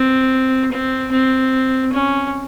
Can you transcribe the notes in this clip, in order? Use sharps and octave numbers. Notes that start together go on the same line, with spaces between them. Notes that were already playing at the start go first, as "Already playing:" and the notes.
Already playing: C4
C4
C4
C#4